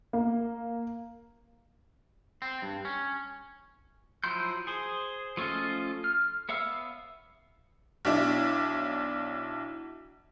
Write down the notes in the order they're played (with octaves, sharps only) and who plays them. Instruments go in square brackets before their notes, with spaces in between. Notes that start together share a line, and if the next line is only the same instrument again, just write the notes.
[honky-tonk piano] A#3
[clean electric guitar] C4
G2
C#4
[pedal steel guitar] F3 F#3 E4 C6 G6
G#4 C5
F3 A3 C#4 F4 D#5
F6
B3 C#5 E5 F5 E6
[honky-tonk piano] B1 D4 E4